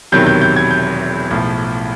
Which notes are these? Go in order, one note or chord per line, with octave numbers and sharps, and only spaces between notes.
E1 E2 C3 D#3 F#3 G6
G6
G6
G#6
G6
B1 A2 F3